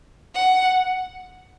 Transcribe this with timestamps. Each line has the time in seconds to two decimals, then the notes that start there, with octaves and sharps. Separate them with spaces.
0.35 F#5